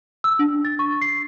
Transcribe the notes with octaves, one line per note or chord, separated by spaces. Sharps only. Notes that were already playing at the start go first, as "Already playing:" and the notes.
E6
D4
A6
C#6
C7